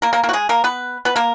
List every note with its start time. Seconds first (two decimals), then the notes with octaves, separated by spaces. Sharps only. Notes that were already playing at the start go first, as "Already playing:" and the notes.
0.02 A#3 A#4
0.13 A#3 A#4
0.23 A#3 A#4
0.29 F#4
0.33 G#3 G#4
0.49 A#3 A#4
0.64 B3 B4
1.05 B3 B4
1.16 A#3 A#4